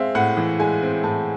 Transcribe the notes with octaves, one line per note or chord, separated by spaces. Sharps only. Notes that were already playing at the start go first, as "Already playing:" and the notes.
Already playing: G#3 C4 E5 F5
A2 F#5
E3
G#3 G#5
C4
A2 A5